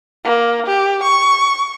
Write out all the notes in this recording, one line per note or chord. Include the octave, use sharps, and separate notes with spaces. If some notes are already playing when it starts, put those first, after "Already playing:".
A#3
G4
C#6